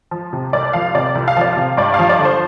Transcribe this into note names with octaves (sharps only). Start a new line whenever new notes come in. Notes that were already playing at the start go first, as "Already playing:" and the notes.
F3
C3
C2 D5
F3 F5
C3 D5
C2
F5
F3 D5
C3 F5
G2 D5
F3 F5
D5
D3
C5